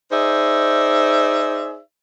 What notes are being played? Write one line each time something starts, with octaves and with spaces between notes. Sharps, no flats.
D#4 G#4 C5 D5 E5